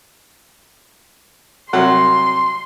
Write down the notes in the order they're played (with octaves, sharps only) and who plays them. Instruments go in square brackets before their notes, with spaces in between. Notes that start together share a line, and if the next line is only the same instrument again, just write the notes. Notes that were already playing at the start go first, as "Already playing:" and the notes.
[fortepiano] C2 F#3 F#5 [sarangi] C6